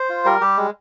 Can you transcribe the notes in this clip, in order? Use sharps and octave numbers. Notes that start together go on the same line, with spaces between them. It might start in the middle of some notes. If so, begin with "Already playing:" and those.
Already playing: C5
F4
G3 A#4
G3 G4
G#3